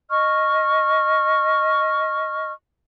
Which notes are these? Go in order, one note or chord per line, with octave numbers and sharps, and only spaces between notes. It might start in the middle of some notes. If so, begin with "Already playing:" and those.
D#5 C#6 F6